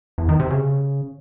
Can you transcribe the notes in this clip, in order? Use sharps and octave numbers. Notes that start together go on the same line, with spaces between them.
E2
D#3
C3
C#3